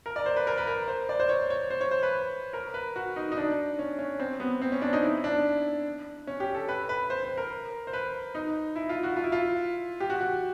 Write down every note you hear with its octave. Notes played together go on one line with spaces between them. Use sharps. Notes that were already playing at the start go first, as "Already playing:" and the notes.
A#4
D5
C5
B4
A#4
B4
A#4
C5
D5
C5
C#5
C#5
C5
C#5
C5
B4
A#4
B4
F#4
D#4
D#4
D4
C#4
C#4
C4
B3
C4
C#4
D4
D#4
E4
D4
C#4
G4
A4
B4
B4
C5
C5
A#4
C5
B4
D#4
E4
F4
F#4
F4
E4
F4
G4
F#4
F#4